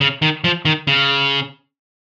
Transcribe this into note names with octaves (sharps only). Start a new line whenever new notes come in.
C#3
D#3
F3
D#3
C#3